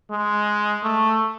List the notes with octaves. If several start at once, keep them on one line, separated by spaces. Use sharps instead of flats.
G#3
A3